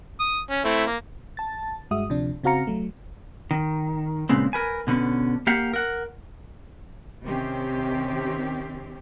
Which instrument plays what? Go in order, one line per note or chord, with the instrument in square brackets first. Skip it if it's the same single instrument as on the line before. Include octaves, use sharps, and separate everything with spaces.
[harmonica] D#6
C#4
A3 C4 E4
A#3
[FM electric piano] A5 A6
G2 G#3 F#4 E5 D#6
D2 C3 F3 D4
C#3 C4 F#4 F5 A#5 C#7
F#3 A3
[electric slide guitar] D#3
A#2 C#3 G#3 B3 C4
A#4 B4 G#5
B2 D3 B3 C#4
A#3 G4 F5 F#5
A#4 F#5
[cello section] C3 D#3 C4 C#4 G4